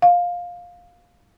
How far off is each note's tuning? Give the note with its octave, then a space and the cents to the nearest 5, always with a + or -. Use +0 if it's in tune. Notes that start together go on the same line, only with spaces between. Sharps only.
F5 +15